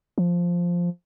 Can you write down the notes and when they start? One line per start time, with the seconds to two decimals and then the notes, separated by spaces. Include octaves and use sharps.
0.18 F3